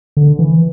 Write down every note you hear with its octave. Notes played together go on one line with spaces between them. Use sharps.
D3
E3